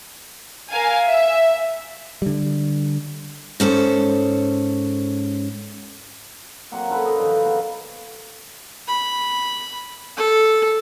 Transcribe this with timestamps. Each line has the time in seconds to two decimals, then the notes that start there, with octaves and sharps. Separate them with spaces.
0.70 A#4 F5 G#5
1.08 E5
2.22 D3 G3
3.60 G#2 C#4 A4 C5
6.71 F#3 A#3 C4 F#5
6.88 C#4 F4 A4 B4
7.03 A4 C#5 D#5
7.17 G2 D3 D#3 F3
7.45 B3 F#4 G#4 A#4
8.88 B5
10.17 A4